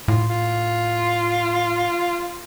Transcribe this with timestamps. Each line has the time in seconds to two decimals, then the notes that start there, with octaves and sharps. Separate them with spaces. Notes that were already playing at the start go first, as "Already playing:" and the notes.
0.08 A2 F4
0.30 F4